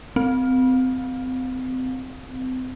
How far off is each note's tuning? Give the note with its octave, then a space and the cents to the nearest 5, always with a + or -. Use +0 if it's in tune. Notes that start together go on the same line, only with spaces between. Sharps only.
C4 -30